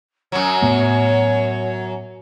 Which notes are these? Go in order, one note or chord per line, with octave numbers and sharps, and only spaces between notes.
F#2 F#3 C#5
A2 A3 B3